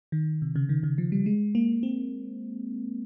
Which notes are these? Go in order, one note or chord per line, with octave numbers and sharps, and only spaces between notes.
D#3
C3
C#3
D#3
C#3
F3
G3
G#3
A#3
C4